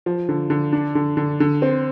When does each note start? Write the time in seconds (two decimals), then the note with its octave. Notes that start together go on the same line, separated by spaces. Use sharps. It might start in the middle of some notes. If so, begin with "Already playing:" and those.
0.06 F3
0.29 D3
0.50 D3
0.73 D4
0.95 D3
1.17 D3
1.40 D3
1.62 C4